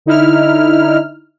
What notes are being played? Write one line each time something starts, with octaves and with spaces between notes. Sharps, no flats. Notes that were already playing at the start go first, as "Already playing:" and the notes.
D3 D#4 E4 F6